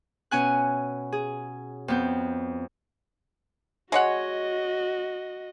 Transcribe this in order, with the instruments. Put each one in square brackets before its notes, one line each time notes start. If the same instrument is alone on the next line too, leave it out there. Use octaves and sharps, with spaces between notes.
[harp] B2 C#4 G#5 F#6
G#4
F2 B3 G6
[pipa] G#3 C#5 F#5 [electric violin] F#4 D#5